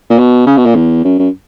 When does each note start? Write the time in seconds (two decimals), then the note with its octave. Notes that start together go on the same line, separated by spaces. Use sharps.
0.10 A#2
0.18 B2
0.46 C#3
0.57 B2
0.66 A#2
0.75 E2
1.05 F#2
1.19 F#2